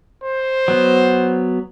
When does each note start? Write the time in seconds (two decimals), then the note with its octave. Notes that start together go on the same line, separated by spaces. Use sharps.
0.23 C5
0.68 F#3 B3